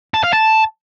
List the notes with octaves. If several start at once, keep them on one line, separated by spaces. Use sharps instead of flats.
A5
F5
A5